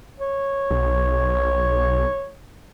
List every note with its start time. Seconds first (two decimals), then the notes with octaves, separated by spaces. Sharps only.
0.20 C#5
0.71 B1